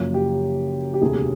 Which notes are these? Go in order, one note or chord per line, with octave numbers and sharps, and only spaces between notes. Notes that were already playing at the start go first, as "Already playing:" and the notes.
Already playing: F#1 F#2 C#3 F3
G4
G4
E1 D2 C3 G#4